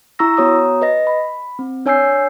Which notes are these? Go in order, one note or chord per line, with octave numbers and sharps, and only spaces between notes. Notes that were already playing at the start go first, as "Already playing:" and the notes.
E4 A#5 C#6 E6 A#6
B3 F#4 C#5 A#5 D#6
B4 D#5 A#6
B5
C4
D4 C#5 G#5 E6 G6 C7